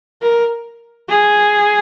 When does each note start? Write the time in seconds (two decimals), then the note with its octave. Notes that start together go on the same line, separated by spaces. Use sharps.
0.22 A#4
1.09 G#4